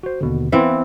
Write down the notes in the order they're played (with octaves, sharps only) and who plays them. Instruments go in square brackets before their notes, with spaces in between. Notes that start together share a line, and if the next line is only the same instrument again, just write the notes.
[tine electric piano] F#4 C5
D#2 B2 D3
[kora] E3 C4 [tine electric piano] B3 B4 F5